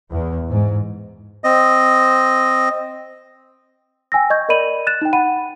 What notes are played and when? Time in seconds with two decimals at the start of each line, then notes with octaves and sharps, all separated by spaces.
0.12 E2
0.49 G#2
1.44 C4 D#5
4.12 G5 G#5 E6 A#6
4.30 D#5 C#6 G6 G#6
4.49 A#4 D5 D#5 B5 D#7 F#7
4.87 F#6 A6 E7
5.02 D#4 G5
5.13 F#5 B5 D#7